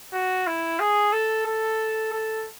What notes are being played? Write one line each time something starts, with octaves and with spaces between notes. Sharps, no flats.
F#4
E4
G#4
A4
A4
A4